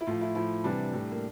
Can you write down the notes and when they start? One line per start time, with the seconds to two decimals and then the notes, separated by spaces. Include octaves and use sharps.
0.01 E4
0.07 A2 F3 F4
0.21 E4
0.35 A2 F3 E4
0.64 C3 E3 G3 D4
0.93 A2 G3
1.12 A#3